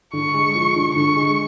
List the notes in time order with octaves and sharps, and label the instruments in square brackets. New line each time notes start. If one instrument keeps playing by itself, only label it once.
[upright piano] D3 [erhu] C#6
[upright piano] G#3
F3
D3
[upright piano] D3 [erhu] C#6
[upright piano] G#3